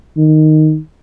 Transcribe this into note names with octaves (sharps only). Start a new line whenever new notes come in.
D#3